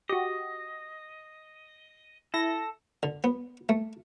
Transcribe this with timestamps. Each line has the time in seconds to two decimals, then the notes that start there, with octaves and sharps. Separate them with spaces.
0.09 F#4 G4 D#5
2.34 E4 A4 A#6
3.03 D3
3.24 B3
3.69 A3